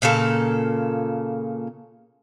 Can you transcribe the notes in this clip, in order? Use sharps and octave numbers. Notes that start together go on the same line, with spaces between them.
A#2 C#3 A#3 A4